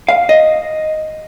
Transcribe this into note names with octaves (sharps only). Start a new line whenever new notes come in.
F5
D#5